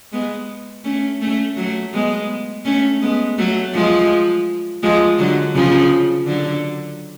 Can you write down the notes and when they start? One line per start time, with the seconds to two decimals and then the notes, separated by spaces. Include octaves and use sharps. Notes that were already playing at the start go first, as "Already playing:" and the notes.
0.12 G#3 B3
0.84 A3 C#4
1.21 A3 C#4
1.57 F#3 A3
1.93 G#3 B3
2.65 A3 C#4
3.02 G#3 B3
3.38 F#3 A3
3.74 F3 G#3
4.83 F3 G#3
5.19 D3 F#3
5.54 C#3 F3
6.27 D3 F#3